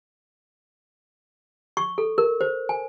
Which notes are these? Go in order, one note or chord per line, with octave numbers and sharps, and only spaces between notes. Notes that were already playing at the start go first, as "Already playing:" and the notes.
C#6
A4
A#4
C5
G#5